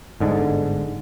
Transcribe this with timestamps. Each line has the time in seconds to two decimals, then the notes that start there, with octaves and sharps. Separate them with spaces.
0.20 G1 G#2 D3